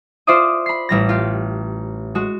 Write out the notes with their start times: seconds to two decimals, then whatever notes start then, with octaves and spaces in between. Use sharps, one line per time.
0.27 F4 C5 D5 E5 D6 D#6
0.66 B5 C7
0.89 A1 G3 A#6
1.09 F4 G4
2.15 G#3 F#4